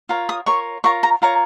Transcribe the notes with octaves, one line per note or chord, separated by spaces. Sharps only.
F4 A#4 C#5
D#6
F4 A#4 C#5 C#6
F4 A#4 C#5 C#6
A#5
F4 A#4 C#5 A#5